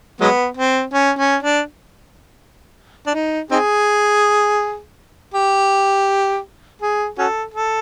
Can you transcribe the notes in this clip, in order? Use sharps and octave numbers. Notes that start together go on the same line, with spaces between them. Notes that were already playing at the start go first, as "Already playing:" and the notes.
F#3 G#3 B3
C4
C#4
C#4
D4
D4
D#4
C4 D#4 G#4
G4
G#4
C#4 F#4 A4
A4